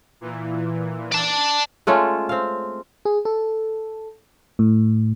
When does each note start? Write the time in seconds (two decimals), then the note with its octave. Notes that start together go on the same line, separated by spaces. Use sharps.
0.21 A#2 E3
1.12 D5 A5
1.87 G#3 A3 C#4 F4
2.29 C4 F5
3.05 G#4
3.25 A4
4.59 A2